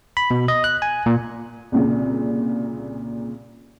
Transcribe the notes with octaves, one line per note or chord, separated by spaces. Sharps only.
B5
B2
D#5
F#6
G#5
A#2
C2 A#2 C#3